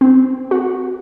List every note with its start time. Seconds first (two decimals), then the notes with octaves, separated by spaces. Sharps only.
0.01 C4
0.51 F#4